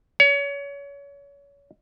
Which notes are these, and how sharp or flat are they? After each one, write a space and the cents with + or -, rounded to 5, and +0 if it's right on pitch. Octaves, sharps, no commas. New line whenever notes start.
C#5 +30